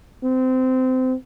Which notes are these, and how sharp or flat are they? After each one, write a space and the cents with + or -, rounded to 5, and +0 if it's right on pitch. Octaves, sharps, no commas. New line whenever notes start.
C4 -25